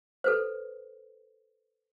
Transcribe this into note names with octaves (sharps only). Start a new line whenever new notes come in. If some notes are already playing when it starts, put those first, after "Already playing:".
A4 B4 C5